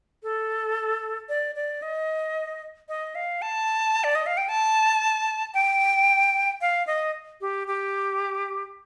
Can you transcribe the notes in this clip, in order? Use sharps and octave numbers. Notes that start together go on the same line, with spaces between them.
A4
D5
D5
D#5
D#5
F5
A5
D5
D#5
F5
G5
A5
G5
F5
D#5
G4
G4